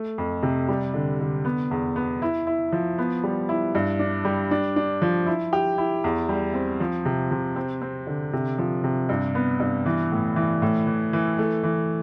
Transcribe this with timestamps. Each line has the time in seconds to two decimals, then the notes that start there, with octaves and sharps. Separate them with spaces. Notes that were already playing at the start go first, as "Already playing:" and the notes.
Already playing: A3
0.18 F2
0.43 C3
0.68 G3
0.94 D3
1.20 D3
1.45 B3
1.71 E2
1.96 B3
2.22 E4
2.47 E4
2.72 F3
2.98 B3
3.24 G3
3.49 E4
3.75 G2
3.99 D4
4.25 G3
4.51 D4
4.76 D4
5.02 F3
5.26 E4
5.53 G4
5.78 E4
6.04 E2
6.29 G3
6.54 C4
6.80 F3
7.05 C3
7.31 C3
7.56 C4
7.81 C4
8.07 D3
8.33 C3
8.58 F3
8.84 C3
9.09 G2
9.35 B3
9.60 G2
9.86 E3
10.12 A2
10.36 E3
10.62 A2
10.87 E3
11.13 E3
11.39 A3
11.63 E3